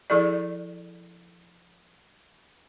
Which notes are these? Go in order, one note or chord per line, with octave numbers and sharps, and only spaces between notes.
F3 E4 G#4 A4 D5